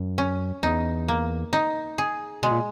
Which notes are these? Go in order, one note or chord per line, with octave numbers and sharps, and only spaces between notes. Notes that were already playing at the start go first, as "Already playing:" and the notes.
Already playing: F#2
C#4
E2 D#4
A#3
D#4
G#4
B2 G#3
A#2